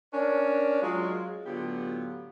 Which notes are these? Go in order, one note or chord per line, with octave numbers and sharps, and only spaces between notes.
C#4 D4 A#4
F#3 G#3 F4
A2 D3 F#3 B3 F4 G4